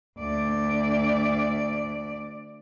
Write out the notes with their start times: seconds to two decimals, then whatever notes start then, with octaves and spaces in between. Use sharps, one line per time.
0.18 D2 D5